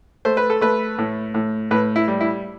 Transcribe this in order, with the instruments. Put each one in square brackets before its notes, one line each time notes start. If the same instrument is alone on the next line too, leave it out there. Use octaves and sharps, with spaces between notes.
[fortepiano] A3 C5
B4
A4
A3 B4
A2
A2
A2 B4
E4
G3
E4